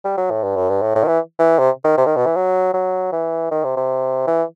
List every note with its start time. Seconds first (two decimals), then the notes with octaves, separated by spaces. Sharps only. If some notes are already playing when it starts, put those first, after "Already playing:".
0.04 G3
0.17 F#3
0.30 A2
0.43 G2
0.56 F#2
0.69 G2
0.82 A2
0.95 A2
1.04 D#3
1.07 E3
1.39 E3
1.58 C3
1.84 D#3
1.97 C3
2.06 D#3
2.16 B2
2.26 E3
2.36 F#3
2.74 F#3
3.12 E3
3.51 D#3
3.64 C3
3.76 C3
4.27 E3